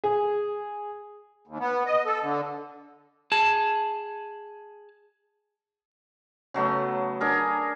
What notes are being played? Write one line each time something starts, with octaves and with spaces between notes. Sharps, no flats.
G#4
D#2
B3
D#5
A4
D3
G#4 A5
C#3 F#3 A3 B3
D4 G#4 A#4